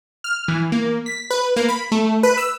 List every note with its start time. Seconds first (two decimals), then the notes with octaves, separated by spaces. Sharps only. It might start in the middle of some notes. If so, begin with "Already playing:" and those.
0.24 F6
0.48 E3
0.72 A#3
1.06 B6
1.31 B4
1.56 A#3
1.68 B5
1.92 A3
2.23 B4
2.37 E6